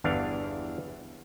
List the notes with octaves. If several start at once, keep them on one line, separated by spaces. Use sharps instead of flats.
G1 E2 E3 D4 F5